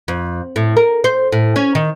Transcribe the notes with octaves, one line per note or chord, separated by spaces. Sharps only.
F2
A2
A#4
C5
A2
C#4
D#3